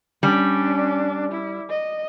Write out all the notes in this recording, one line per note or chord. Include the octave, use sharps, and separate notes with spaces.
G3 C#4 D4
E4
D#5